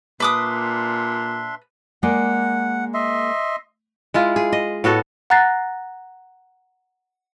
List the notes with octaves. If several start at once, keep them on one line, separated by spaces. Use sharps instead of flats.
A#2 D4 B4 E5 C6 D6 D#6
G#3 A#3 D5 F#5
D#5 E5 C6
G#3 E4 F4
G#4
D#5
A2 B3 F#4 A4
F#5 A#5 F#6 A6 A#6 C7